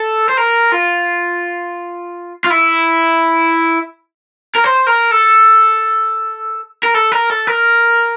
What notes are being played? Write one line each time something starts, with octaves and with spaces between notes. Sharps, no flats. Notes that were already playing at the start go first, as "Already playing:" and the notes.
Already playing: A4
C5
A#4
F4
F4
E4
A#4
C5
A#4
A4
A#4
A4
A#4
A4
A#4